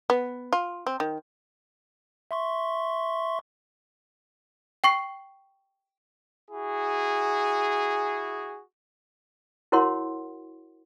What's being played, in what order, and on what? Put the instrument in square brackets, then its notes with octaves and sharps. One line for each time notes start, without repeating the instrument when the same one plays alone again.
[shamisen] B3
F4
C4
D#3
[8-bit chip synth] E5 C6 C#6
[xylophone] G5 C#6 C7
[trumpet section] E4 F#4 G#4
[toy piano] E4 F#4 A#4 C#5 F#5 C6